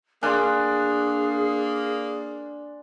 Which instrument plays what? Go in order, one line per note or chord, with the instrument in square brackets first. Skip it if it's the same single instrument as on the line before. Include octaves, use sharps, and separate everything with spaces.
[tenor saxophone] A#3 [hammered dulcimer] D4 [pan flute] G#4 [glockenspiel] G#5 C6